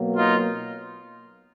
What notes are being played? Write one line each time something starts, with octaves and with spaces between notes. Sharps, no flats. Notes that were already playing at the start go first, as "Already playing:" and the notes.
Already playing: B2 F#3 A#3
D#4 F4